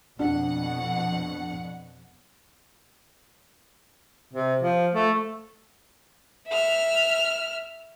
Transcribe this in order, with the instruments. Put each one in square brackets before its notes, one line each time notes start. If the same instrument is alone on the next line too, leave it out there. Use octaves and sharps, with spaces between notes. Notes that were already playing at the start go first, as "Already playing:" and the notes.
[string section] F2 B2 F#5 [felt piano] D4
[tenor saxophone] C3
F3
A3
[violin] E5 F6